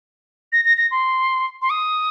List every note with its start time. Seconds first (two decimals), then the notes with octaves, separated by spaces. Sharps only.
0.53 A#6
0.65 A#6
0.77 A#6
0.91 C6
1.62 C6
1.70 D#6